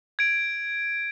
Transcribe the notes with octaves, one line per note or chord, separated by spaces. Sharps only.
G#6 D7